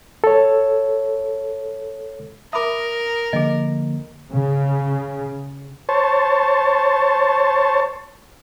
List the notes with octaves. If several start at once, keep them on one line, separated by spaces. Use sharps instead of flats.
A4 C#5
A#4 E5 B5 D6 D#6
D3 F3 A#3 G#4 D#5
C#3
C5 C#5 A5